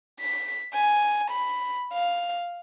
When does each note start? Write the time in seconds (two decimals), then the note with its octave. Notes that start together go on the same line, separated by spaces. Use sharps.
0.21 B6
0.74 G#5
1.31 B5
1.93 F5